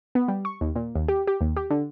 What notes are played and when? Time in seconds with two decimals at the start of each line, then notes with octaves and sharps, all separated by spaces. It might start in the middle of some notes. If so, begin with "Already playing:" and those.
0.15 B3
0.28 G3
0.45 C#6
0.61 D#2
0.76 A#2
0.96 D#2
1.08 G4
1.27 G4
1.41 D#2
1.56 G4
1.70 D3